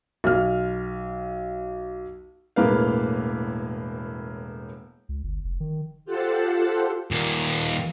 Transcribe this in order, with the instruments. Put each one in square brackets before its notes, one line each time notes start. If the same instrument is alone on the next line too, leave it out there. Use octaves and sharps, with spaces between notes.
[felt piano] B1 F6
E1 A2 A#3 B4 F5
[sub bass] C#2
G1
F1
D#3
[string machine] F4 G4 A4 C5 F#5 A5
[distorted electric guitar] D#2 A#2